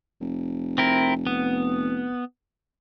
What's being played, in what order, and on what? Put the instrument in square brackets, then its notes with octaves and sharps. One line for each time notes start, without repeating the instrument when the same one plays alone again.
[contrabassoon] F1
[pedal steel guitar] C4 E4 A#4
B3